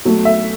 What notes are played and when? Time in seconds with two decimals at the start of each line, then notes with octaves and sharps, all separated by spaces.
0.05 B2 F#3 A3
0.25 E5